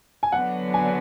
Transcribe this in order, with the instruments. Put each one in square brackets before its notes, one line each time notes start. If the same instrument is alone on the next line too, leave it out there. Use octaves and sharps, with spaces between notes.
[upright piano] G#5
[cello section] D3 F#3 B3 D4 [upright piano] F#5
[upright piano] G#5